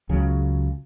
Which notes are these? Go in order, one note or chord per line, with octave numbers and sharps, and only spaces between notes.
C#2 C#3 F#3